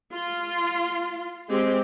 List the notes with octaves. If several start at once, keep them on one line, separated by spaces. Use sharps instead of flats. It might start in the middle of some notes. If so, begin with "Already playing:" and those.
F4 C6
G#3 C4 G4